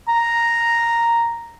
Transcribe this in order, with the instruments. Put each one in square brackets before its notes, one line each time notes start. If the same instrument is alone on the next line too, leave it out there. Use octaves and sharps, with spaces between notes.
[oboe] A#5